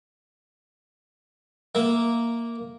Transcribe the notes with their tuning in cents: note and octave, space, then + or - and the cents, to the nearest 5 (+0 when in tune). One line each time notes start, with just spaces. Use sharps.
A#3 +0 E5 +0